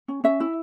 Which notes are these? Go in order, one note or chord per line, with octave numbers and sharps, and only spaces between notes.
C#4
C#4 E5
E4